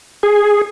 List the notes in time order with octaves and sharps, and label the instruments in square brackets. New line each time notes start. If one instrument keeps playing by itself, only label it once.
[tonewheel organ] G#4